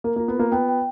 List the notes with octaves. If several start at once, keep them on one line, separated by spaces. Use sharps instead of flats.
A#3 A#4
A#3 F4
B3
A#3 F4
B3 G5
G5